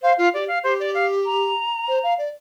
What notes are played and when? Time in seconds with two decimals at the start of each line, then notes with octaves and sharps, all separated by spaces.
0.02 C5 F5
0.18 F4 F5
0.34 G4 D5
0.48 F5
0.64 G4 C5
0.80 D5
0.95 F5
1.26 A#5
1.88 C5
2.03 F5
2.18 D5